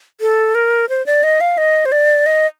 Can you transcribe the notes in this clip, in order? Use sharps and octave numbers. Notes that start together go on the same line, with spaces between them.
A4
A#4
C5
D5
D#5
F5
D#5
C5
D5
D#5